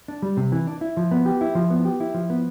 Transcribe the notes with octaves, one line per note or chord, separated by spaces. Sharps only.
D4
G3
C3
E3
D4
E4
F3
B3
G4
E4
F3
B3
G4
E4
F3
B3